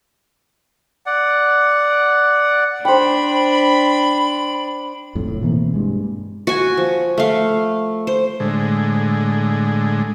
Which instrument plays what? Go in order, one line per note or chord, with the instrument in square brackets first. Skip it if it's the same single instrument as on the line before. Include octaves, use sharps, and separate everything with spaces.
[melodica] D5 F#5
[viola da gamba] D4 [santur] C5 G5 [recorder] B5
[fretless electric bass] F2 A2
F#1 A2
B2 E3 A#3 C4
G2 G#3
[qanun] F#4 G#5
F3
A3 F5
C5
[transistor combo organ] A2 D3 G#3